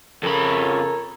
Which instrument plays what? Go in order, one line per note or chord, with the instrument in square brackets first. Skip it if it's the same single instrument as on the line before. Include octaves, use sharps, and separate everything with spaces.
[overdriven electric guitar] F2 B5 [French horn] C#3 [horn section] A4 C#5 [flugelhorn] A#4